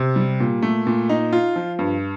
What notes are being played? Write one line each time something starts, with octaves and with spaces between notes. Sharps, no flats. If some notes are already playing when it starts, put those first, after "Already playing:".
Already playing: C3
G3
A#2
A3
A#2
D#4
F4
F3
G2